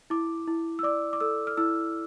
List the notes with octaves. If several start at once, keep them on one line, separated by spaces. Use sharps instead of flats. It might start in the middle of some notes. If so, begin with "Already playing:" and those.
E4 D6
E4
E6
D5 D6
D6
A4 E6
F6
E4 E6